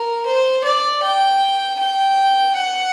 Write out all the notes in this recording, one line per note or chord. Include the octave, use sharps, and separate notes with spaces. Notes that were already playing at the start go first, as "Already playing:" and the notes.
Already playing: A#4
C5
D5
G5
G5
F#5